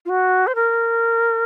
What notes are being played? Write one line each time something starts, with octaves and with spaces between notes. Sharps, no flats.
F4
F#4
C5
A#4